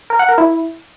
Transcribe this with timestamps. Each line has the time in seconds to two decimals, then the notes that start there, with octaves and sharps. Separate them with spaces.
0.10 A#4
0.19 F#5
0.29 A#4
0.38 E4